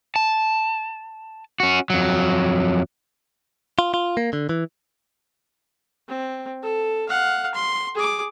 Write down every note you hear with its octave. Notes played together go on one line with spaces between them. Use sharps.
A5
C#4 F#4
F2 F#3
F4
F4
A#3
D3
E3
C4
A4
F5 F#5
C6
G#4 D6